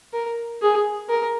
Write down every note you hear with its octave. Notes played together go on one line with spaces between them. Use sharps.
A#4
G#4
A#4